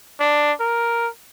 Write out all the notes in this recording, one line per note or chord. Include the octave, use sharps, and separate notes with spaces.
D4
A#4